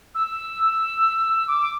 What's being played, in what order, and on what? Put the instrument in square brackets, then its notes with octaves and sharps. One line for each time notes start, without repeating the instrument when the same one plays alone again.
[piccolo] E6
D6